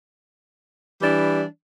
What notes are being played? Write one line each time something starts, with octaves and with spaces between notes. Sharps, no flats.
E3 G3 D4